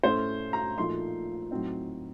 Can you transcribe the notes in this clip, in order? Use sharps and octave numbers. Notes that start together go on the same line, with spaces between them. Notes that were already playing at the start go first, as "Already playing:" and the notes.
A2 A3 C#4 C5
A#5
A#2 F3 A3 D#4 C6
A2 F#3 C4 D#4